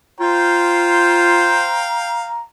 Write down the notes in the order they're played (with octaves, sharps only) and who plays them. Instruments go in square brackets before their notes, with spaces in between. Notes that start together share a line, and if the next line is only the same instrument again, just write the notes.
[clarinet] F4 [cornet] C5 [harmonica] F5 G5 [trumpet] A#5